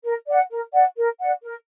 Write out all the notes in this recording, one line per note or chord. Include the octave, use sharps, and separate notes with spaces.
A#4
D5 F#5
A#4
D5 F#5
A#4
D5 F#5
A#4